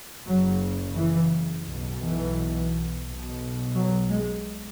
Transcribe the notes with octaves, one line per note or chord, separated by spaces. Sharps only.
F#1 F#2 C#3 F#3
E3
B1 B2
E3
B1 B2
F#3
G#3